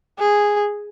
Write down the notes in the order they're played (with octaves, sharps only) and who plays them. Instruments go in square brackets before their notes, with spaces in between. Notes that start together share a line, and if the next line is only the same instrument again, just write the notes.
[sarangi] G#4